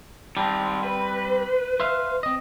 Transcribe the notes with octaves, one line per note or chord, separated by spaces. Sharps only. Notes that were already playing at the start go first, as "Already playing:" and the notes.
D#3 G3 C4 A5
B4
C5 E5 F5
C4 D#5